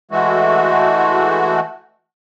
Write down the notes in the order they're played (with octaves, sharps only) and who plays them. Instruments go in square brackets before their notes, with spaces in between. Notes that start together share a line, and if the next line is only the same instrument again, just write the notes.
[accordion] E3 G#3 A3 F#4